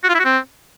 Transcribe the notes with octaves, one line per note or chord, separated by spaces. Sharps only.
F#4
F4
E4
F#4
C4